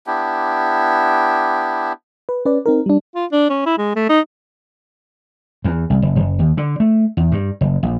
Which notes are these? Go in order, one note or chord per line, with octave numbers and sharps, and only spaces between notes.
B3 D4 E4 G4
B4
C#4 B4 D5
C4 D#4 A#4
G3 D4
F4
D4
C#4
E4
G#3
A3
D#4
E2
C2
F#1
F#1
D#2
D3
A3
E2
G2
F#1
A#1